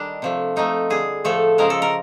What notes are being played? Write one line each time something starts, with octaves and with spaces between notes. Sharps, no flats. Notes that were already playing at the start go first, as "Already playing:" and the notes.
Already playing: D#3 G3 D4
C3 F3 A3
C3 F3 A3 D#4
D3 G3 G#4
A2 F3 A3 A4
C#3 F3 G#3 A#4
A4
A#4